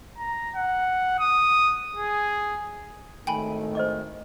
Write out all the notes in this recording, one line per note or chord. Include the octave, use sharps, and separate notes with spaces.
A#5
F#5
D#6
G#4
G#1 A2 D#3 A3 G5 G#5 B5
C5 D#5 D6